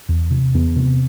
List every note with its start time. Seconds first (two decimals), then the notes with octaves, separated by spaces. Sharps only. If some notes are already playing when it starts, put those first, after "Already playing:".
0.09 E2
0.31 C3
0.54 E2 B3
0.76 C3